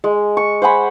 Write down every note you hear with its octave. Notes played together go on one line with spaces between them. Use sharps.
G#3
C#6
C5 F#5 G#5 B5